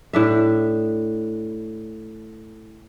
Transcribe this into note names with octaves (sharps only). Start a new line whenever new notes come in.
A2 D4 E5